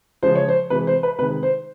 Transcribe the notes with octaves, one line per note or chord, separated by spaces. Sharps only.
C#3 F3 G#3 C5
C#5
C5
C3 E3 G#3 B4
C5
B4
C3 D#3 G#3 B4
C5